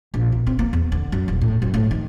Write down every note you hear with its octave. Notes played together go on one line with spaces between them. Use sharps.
A#1
B2
C4
A#3
E2
D3
F#2
D#1
A2
F#2
A2
D#3